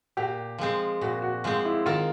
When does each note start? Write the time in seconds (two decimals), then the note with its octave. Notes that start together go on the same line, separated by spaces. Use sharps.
0.17 A#2 G4
0.58 F3 G#3 C4
1.01 A#2 F#4
1.22 F#4
1.44 F3 G#3 C4 F4
1.65 E4
1.86 D#3 F4